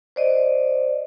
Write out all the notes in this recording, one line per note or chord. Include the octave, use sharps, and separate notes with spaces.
C5 D5 D#5